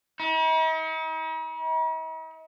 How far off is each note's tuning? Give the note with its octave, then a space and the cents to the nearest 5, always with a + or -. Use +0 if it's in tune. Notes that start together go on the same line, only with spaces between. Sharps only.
D#4 +45